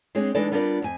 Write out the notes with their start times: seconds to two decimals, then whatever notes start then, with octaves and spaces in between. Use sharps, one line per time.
0.15 G#3 C4 D4 G#4 C#5
0.35 E3 G#3 D4 D#4 A4 D5
0.52 G3 B3 D4 F4 A#4 D5
0.82 F2 G#5